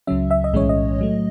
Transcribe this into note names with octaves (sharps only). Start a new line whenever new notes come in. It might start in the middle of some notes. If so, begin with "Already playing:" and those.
C#2 C#3 F#3 C#4 E5
E5
D#5
B1 A2 E3 G#3 C#4 C#5
D#5
A2 F#3 A3